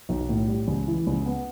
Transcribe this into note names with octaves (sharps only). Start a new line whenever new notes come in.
B1
A2
G3
C#2
E3
C#2
B3